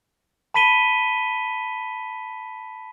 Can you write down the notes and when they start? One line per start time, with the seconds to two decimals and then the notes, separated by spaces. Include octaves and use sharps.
0.54 A5 B5 B6 D#7 G7